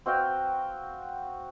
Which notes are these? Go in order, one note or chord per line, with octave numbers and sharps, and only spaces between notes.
C4 F#4 F5 G5